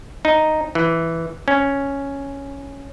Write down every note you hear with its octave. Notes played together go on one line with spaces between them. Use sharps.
D#4
E3
C#4